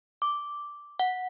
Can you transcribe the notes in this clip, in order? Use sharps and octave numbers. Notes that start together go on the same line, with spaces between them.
D6
F#5